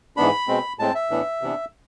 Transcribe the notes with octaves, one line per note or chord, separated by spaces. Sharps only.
G#2 E3 B3 D4 B5
B2 G#3 C4
A2 G#3 C4 A5
E5
A2 E3 B3 D4
C3 E3 B3 D4